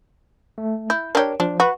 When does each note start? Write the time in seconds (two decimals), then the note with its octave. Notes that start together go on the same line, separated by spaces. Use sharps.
0.58 A3
0.90 E4 G6
1.15 D4 G4 A#4 C#5
1.40 F3 D4
1.60 F#4 B4